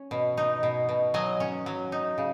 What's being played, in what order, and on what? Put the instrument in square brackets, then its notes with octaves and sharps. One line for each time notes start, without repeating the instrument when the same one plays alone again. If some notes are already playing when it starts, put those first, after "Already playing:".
Already playing: [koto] C#4
B2
D#4
B2
B2
F#3 D#5 G#5
C#4
F#3
D#4
C#3